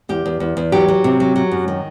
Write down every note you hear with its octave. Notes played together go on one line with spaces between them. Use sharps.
E2 G4
E2
E2
E2
F#3 G4
F#3
C3
F#3
F#3
F#2
D#3